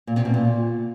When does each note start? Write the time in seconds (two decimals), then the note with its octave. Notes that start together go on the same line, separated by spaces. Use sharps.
0.07 A#2
0.16 C3
0.25 B2
0.34 A#2